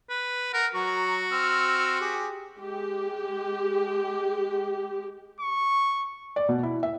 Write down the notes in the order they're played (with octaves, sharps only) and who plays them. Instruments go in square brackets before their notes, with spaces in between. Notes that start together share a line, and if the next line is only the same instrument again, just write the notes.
[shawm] B4
[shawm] A#4 [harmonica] F#5
[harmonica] F#3 A#5 C#6 [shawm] F#4
[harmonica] C4 E6 F6
G4 G#4
[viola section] G#3 G4
[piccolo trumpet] C#6
[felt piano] D5
B2
E4
E5